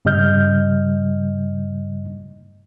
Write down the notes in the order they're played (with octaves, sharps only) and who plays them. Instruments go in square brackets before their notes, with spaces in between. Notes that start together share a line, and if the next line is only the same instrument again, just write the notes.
[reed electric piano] G2 C#3 G3 D#5 F6 G6